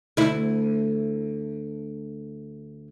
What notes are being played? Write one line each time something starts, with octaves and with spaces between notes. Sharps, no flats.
D2 E4